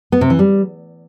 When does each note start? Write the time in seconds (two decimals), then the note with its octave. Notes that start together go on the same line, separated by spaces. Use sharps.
0.12 B3
0.21 C3
0.30 E3
0.39 G3